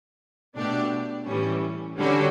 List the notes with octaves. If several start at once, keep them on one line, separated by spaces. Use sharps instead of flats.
B2 A3 D4 G4 D5
A2 E3 G3 C#4
D3 G3 C#4 F#4 A4